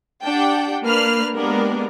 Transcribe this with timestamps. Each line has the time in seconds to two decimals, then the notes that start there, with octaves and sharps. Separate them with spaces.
0.23 D4 G4 F#5 G5 A5
0.83 A#3 D4 B4 F6 C7
1.35 G#3 A#3 B3 D4 G4 A#4